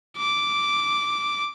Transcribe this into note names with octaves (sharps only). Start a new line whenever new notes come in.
D6